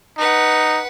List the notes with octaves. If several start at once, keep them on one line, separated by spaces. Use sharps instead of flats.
D#4 B4 F#5